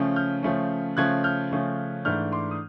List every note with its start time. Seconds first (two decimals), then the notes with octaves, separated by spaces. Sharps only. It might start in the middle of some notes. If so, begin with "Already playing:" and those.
Already playing: C#3 F3 A3 C#4
0.16 F6 G6
0.43 C#3 F3 A3 C#4
0.97 C#3 F3 A3 C#4 F#6 G#6
1.24 F6 G6
1.51 C#3 F3 A3 C#4
2.05 G#2 E3 A3 D4 F6 G6
2.32 C6 D6
2.51 D#6